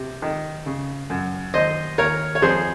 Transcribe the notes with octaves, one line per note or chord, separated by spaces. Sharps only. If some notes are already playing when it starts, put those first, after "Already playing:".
Already playing: C3
D#3
C#3
F#2
D#2 C5 D#5
D#2 A#4 C#5
C#5
F2 G#4 C5